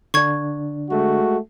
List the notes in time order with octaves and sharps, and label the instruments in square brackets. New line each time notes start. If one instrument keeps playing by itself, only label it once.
[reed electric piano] D3 D4 [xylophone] C#6 G#6
[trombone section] G#3 A3 F#4